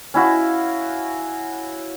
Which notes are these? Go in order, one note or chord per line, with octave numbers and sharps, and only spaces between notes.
C#4 E4 F#4 F5